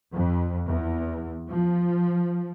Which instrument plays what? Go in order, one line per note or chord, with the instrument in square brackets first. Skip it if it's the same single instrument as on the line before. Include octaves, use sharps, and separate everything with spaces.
[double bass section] F2
E2
F3